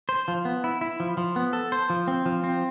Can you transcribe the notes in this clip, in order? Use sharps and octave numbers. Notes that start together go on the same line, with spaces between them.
C5
F3
B3
E4
E4
F3
F3
B3
A4
C5
F3
C4
F3
C4